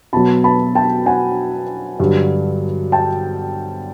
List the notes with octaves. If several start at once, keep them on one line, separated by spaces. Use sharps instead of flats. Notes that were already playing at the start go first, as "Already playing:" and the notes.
B2 F#3 A5 B5
A5 B5
G5 A5
F#5 G#5
G2 D3 F#3
G5 A5